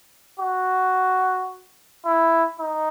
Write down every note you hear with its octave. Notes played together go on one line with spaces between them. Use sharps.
F#4
E4
D#4